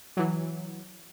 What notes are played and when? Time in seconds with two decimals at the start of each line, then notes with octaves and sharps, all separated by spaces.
0.17 E3 F#3